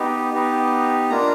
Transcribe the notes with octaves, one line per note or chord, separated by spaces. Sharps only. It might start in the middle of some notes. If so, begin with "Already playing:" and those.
Already playing: B3 D#4 G4
B3 D#4 G4
A#3 D4 F4 A#5